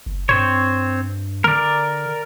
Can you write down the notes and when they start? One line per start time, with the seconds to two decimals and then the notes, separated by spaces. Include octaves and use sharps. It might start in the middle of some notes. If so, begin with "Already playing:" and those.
0.06 F#1
0.29 G2 C4 C5 C#5
1.44 D3 A#4 D5